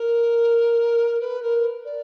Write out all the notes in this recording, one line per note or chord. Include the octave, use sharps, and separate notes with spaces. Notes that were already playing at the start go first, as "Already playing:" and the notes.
Already playing: A#4
B4
A#4
D5